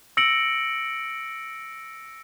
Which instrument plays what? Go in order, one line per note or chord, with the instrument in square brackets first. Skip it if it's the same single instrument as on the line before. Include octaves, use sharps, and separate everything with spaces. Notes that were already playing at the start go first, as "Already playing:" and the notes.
[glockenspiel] E6 A#6 C#7 D7 F#7